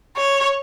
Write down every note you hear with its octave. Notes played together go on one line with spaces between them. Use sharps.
C#5